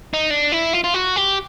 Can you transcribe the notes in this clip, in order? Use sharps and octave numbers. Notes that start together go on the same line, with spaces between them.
D#4
D4
E4
F4
F4
F#4
G4